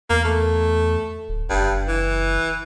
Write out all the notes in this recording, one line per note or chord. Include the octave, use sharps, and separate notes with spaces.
E2 A#3
A3
D1
F#1 G2
E3